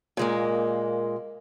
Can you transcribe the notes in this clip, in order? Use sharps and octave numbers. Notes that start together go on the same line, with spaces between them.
A#2 G#3 A#3